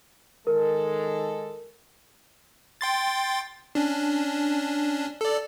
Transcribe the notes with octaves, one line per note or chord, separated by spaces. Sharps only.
D#3 G#3 A4 A#4
G5 C6 A6
C#4 D4
A4 D5